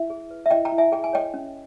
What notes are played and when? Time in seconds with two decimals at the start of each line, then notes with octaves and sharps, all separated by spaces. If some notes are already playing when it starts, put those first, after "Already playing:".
Already playing: E4 E5
0.10 G#4
0.30 B4
0.46 E5
0.51 E4 D#5 G5
0.65 G5 A#5
0.72 E4
0.78 E5 G#5
0.92 G#4 G5
1.04 G#5
1.13 C#5 D#5 G5
1.34 C#4